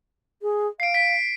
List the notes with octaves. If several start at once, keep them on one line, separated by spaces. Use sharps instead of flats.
G#4
F5 C7 D7
B6 D7